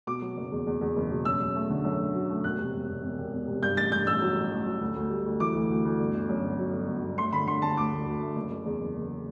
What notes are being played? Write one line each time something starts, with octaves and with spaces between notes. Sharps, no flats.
B2 D6
F#3
F#1
E2
E2
E2
F#1
B2
F#2 E6
F#2
A3
D3
F#2
D3
F#3
A3
E1 F#6
C3
E1
E1
E1
E1
E1
C3
G2 G6
A1 A6
G2 G6
A1 E6
F#3
A1
A1
F#3
D2
D2
G3
D2
E3 D6
D2
D2
D2
G1
G1
F#2
G1
F#3
G1
G1
G1
A3 C6
D3 B5
D3 C6
D3 A5
D2 D6
D2
D2
A3
F#1
F#1
E2
F#1
F#1